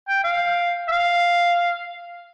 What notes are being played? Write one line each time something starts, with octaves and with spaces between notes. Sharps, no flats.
G5
F5
E5
F5